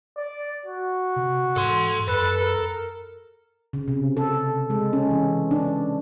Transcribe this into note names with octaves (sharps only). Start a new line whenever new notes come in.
D5
F#4
C3
G#2 A4 C6
F#2 A4 B4
A#4
C#3
C3
A4
G#3
C#4
E3
D4